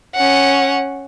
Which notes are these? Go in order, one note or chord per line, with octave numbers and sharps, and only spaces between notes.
C#4 F#5